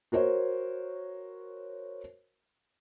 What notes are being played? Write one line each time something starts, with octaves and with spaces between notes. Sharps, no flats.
F#4 A#4 C5 C#5